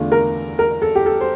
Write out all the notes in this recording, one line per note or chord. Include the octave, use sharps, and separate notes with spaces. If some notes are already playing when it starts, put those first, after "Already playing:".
Already playing: E2 D3 A3 D4 F4
A#4
A#4
A4
G4
A4
C5